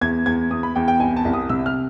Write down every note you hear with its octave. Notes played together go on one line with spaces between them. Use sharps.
E2 G#6
E2 G#6
E2 D#6
B5
E2 G5
G5
C2 G#5
A5
C2
D#6
C3 E6
F6